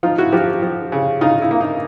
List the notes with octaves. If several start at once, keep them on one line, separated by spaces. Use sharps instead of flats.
F3 D#4 F4
E4 F#4
F3 F4 G4
F3
C#3
C#3 D#4 F4
E4
A#3
D#4